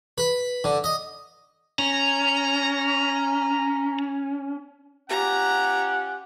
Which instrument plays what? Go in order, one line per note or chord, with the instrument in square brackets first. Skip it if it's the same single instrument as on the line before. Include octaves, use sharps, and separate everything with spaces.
[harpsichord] B4
D3
D#5
[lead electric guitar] C#4 [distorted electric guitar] A#5
[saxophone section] C#4 F4 G4 [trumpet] F#5 [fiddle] A#5